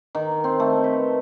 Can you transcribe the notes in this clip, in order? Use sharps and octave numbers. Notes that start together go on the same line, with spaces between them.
D#3
C4
A3
B4